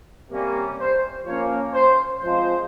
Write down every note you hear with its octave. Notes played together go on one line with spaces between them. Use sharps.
C3 G3 A#3 C#4
C5
F3 A#3 C#4 C#5
C5
F3 G#3 C4 C5